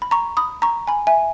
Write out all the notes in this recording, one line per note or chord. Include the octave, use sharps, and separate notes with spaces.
B5
A#5 C#6
B5 D#6
A#5 C#6
G#5 B5
E5 G#5